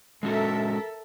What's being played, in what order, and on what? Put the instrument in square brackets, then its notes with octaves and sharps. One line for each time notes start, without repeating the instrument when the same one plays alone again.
[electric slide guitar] G#3 C#4 F#4 [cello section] A4 A#4 E5